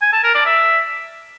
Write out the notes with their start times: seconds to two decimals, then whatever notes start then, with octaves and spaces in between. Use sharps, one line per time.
0.02 G#5
0.13 A5
0.24 A#4
0.35 D5
0.46 E5